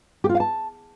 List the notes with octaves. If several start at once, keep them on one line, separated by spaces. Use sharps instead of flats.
G4
F4
F5
A5